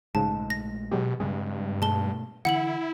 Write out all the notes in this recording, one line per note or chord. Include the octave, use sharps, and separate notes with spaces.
A#1 G#2 C#3 G#3 A3 A5
A#6
B2 F#3 G#3 G4
G2 C#3 G#3 C4 G#4
B2 G#3 A3 A5 G7
D3 E3 E4 F#5 C#7 F#7